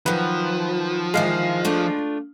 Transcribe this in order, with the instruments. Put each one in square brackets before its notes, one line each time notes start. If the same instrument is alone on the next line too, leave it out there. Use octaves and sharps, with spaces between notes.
[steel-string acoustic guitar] D#3 F#3 [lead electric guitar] F3 [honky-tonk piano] B4
[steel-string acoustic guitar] D#3 E3 D#5 [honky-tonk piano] G#3 F5
[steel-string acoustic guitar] A3 D4 F4